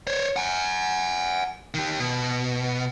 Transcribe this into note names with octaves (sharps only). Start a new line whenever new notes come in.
C5 C#5
F#5 G#5
D#3 G4
B2